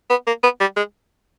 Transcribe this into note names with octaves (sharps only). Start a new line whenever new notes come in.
B3
A#3
B3
G3
G#3